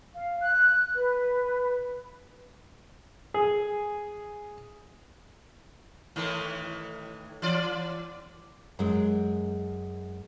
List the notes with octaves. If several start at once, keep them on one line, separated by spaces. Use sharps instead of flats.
F5
F#6
B4
G#4
A2 D#3 E3
E3 D5
F#2 G#3